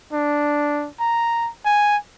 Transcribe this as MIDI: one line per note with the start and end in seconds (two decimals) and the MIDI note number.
0.13 0.89 62
1.00 1.50 82
1.66 1.96 80